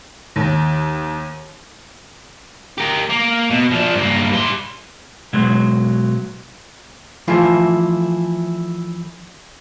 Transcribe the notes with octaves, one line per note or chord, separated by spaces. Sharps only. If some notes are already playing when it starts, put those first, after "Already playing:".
D#2
G4 A#4
A#3
B2
F3 D4
G2 A#3
G3 C6
B2 F#3 G#3
E3 F3 A3 E4 F4